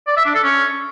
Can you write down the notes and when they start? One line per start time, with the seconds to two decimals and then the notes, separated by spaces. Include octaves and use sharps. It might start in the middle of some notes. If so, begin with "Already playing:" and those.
0.08 D5
0.17 E5
0.26 D4
0.35 A4
0.44 C#4